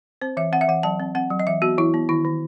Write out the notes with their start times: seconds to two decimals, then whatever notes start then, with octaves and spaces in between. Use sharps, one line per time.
0.22 C4 C5
0.37 E3 E5
0.53 C4 F#5
0.61 E5
0.68 E3 F#5
0.83 F#3 A5
1.00 C4
1.15 C4 F#5
1.30 F#3
1.40 D#5
1.47 E3 E5
1.62 B3 F#4
1.78 E3 E4
1.94 B3
2.09 D#3 E4
2.25 D#3